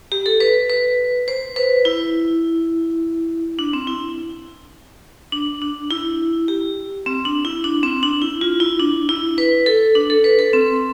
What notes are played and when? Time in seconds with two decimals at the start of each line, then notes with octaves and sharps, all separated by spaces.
0.12 G4
0.26 A4
0.40 B4
0.69 B4
1.28 C5
1.56 B4
1.85 E4
3.59 D4
3.73 C4
3.87 E4
5.32 D4
5.62 D4
5.91 E4
6.48 G4
7.06 C4
7.25 D4
7.45 E4
7.64 D4
7.83 C4
8.03 D4
8.22 E4
8.41 F4
8.60 E4
8.80 D4
9.09 E4
9.38 B4
9.66 A4
9.95 D4
10.10 A4
10.24 B4
10.39 A4
10.53 C4